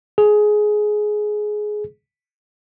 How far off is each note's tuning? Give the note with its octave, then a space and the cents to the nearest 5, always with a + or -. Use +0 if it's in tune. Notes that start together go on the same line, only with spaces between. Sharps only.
G#4 +15